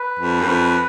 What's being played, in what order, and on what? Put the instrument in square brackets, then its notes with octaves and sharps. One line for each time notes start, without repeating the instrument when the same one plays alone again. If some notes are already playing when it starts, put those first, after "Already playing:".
Already playing: [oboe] B4
[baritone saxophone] F2
F#2
F2